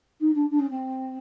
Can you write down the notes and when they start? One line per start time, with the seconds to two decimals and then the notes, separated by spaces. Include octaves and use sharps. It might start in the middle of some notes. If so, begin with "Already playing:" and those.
0.21 D#4
0.35 D4
0.51 D4
0.59 C#4
0.70 C4